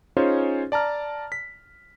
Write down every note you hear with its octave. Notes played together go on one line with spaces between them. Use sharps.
C#4 D#4 F4 G#4 C5 C#5
D5 A5 A#5 F6
B6